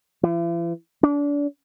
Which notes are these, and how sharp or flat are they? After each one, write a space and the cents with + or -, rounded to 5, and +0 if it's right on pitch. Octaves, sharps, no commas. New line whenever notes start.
E3 +45
D4 -30